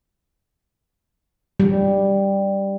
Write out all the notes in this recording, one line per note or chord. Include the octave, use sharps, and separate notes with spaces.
G3